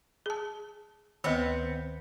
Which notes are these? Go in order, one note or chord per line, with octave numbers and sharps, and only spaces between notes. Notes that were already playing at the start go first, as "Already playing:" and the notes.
G#4 A5
D2 D#3 B3 C4